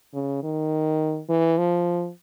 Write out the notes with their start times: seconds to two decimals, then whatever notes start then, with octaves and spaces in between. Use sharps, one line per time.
0.14 C#3
0.43 D#3
1.29 E3
1.58 F3